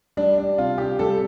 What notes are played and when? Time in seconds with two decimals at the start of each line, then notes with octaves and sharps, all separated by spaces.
0.17 G3 D4
0.38 D4
0.58 C3 F4
0.78 G4
0.99 G3 A4